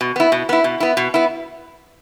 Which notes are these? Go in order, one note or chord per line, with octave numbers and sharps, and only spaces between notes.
B2
B3 E4
B2
B3 E4
B2
B3 E4
B2
B3 E4